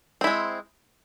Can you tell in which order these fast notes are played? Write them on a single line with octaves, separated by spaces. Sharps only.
C4 E4 G#3